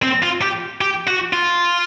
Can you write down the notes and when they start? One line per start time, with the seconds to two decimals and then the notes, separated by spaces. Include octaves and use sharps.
0.02 C4
0.22 F4
0.42 G4
0.81 G4
1.07 F#4
1.33 F4